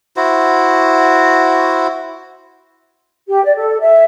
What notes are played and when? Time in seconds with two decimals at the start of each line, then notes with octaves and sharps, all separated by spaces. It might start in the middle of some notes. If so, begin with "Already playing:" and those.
0.17 E4 F#4 C5
3.29 G4
3.44 D5
3.56 A4
3.80 E5